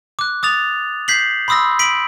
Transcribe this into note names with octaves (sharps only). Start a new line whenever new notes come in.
D6 F#6
D6 D#6 A6 F7
G6 B6 C7 F#7
B5 C6 D#6 E6 A#6
B6 D7 F#7